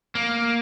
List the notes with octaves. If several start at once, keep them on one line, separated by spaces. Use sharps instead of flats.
A#3